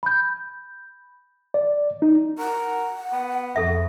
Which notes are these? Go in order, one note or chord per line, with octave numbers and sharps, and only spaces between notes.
B5 G6
D5
D#4
A#4 F#5
B3
F2 G#4 A4 E5